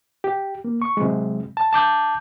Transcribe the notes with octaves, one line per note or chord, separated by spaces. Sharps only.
G4
A#3
C#6
C3 F#3 G#3
A5
A5 D6 G6